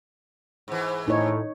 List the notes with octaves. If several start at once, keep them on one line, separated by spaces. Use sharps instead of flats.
G#2 E3
A2 D#4 C#5